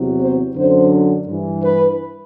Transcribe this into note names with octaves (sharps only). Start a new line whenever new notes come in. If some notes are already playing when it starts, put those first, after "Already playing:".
Already playing: E2 C3 F#3
C5
F#2 D3 F#3 C5
G2 E3
B4